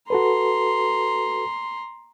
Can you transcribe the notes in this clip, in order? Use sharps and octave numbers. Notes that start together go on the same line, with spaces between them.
F#4 A4 B4 A#5 C6